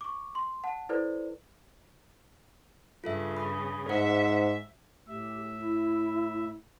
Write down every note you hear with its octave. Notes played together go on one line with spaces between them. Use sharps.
C#6 D6
C6
F#5 A5
E4 A4 B4 C5 D5
G2 C#3 F4 A4 E5
B5 D#6
G#2 C5 E5 F#5 C#7
A2 G4 E5
E4